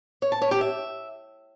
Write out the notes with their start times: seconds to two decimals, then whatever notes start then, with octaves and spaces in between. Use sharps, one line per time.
0.22 C#5
0.32 A5
0.42 C#5
0.51 G4
0.61 E5